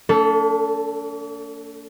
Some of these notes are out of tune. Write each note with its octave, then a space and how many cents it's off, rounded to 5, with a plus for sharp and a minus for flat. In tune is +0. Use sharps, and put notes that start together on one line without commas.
A3 +45 D4 -45 A4 +0